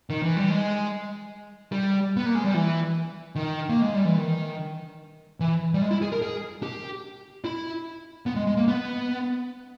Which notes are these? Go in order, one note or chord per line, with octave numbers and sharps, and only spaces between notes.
D#3
E3
G3
G#3
G3
B3
A#3
G#3
G3
E3
D#3
A#3
G#3
G3
E3
D#3
E3
G3
G#3
E4
G#4
A#4
G#4
G4
E4
B3
G#3
G#3
A#3
B3